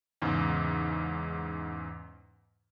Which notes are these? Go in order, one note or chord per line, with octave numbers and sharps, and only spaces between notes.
E2 G#2 C#3